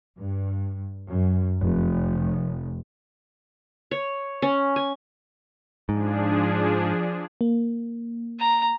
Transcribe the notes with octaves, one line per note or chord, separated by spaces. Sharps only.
G2
F#2
F1
C#5
C#4
G#5
G#2 F3 D4 G#4
A#3
A#5